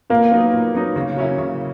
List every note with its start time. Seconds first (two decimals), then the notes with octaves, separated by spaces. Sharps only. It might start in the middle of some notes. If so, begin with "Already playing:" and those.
0.10 A#2 A#3
0.31 F#3 B3 D#4
0.53 A#2
0.75 F#3 B3 D#4
0.96 C#3
1.17 F#3 C#4 E4
1.38 C#3